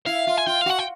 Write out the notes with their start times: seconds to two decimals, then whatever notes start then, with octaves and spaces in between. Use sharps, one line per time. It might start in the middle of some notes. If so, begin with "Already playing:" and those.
0.06 E4 F5
0.27 F4
0.37 G#5
0.46 F4 G5
0.61 F5
0.66 F#4 F#5
0.79 G5